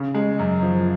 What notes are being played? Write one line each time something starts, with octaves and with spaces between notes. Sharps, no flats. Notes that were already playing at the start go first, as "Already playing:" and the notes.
Already playing: C#3
G#3
F#2
F3